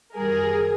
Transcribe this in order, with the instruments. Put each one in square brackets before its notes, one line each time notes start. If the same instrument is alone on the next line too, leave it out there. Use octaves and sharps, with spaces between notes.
[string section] F#2 D#3 G3 G#4 A#4